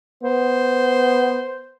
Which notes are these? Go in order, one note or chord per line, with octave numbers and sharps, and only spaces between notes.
B3 C5